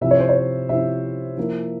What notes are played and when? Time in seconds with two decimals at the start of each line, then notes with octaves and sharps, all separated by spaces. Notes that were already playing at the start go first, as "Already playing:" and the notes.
0.01 C3 F3 C4 E4 E5
0.11 C#5
0.20 C5
0.29 C#5
0.69 C3 F3 C4 E4 E5
1.37 F3 A#3 E4